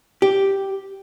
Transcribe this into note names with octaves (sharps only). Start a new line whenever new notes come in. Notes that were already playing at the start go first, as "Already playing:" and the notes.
G4